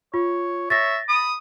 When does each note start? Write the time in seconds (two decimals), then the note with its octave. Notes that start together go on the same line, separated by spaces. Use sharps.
0.14 F4 C#5
0.70 C#5 E5 A6 A#6
1.09 B5 D#6